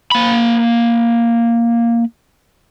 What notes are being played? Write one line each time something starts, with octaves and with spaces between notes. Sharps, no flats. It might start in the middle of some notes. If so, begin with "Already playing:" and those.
A#3 B5